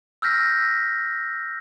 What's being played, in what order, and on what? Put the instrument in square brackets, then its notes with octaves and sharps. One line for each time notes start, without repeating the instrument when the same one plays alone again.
[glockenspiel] E6 F6 G6 A#6 B6